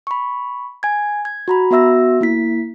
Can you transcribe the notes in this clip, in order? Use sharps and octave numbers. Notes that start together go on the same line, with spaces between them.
B5 C#6
G#5 G#6
G#6
F#4 A#5 B5
B3 F#4 E5 E6 A#6
A#3 E4 B6